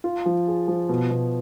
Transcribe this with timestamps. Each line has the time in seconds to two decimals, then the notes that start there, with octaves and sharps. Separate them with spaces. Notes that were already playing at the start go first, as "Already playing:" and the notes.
0.04 F4
0.26 F3
0.48 G#4
0.68 F3
0.89 B2
1.11 B2